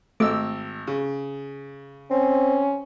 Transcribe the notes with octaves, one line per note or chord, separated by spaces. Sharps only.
G#1 A3 D#5 D6 E6
C#3
C4 C#4